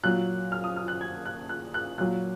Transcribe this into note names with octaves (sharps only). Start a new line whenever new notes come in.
A#2 F#3 F#6
F6
D#6
F6
F#6
G#6
F#6
F#6
F#6
A#2 F#3 F#6